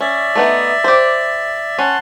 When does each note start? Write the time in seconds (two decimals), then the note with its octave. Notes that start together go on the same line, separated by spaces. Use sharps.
0.01 C#4 D5 E5
0.35 A3 B3 D#4
0.84 G4 C5
1.79 C#4 F#5 A5 C6